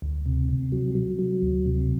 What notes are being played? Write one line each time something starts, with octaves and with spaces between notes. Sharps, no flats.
D2
C3
C3
F#3
F#3
F#3
D2
C3